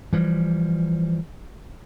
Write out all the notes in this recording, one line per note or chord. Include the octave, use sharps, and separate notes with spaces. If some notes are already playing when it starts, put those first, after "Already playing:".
E3 F3 G3